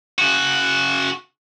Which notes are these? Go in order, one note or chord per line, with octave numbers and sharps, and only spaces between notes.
C#3 F#4